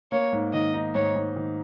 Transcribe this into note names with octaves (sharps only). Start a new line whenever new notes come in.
A#3 C#5
G#2
D#3 D#5
D#4
G#2 C#5
G#2
D#3